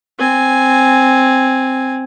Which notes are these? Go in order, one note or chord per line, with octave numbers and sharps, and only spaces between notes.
C4 G#5